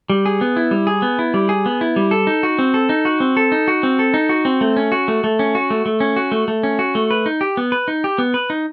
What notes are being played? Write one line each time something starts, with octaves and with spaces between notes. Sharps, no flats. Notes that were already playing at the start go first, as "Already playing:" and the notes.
G3
G#4
B3
E4
G3
G#4
B3
E4
G3
G#4
B3
E4
G3
A4
D#4
F#4
C4
A4
D#4
F#4
C4
A4
D#4
F#4
C4
A4
D#4
F#4
C4
A3
C#4
F#4
A3
A3
C#4
F#4
A3
A3
C#4
F#4
A3
A3
C#4
F#4
A3
B4
D#4
G4
B3
B4
D#4
G4
B3
B4
D#4